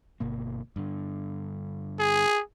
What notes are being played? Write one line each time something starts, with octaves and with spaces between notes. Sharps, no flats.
G1 B2 A#3
G2 D3
G#4